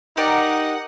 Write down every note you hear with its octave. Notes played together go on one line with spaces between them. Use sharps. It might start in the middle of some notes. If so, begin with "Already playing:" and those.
D#4 G4 A#4 D5 F#5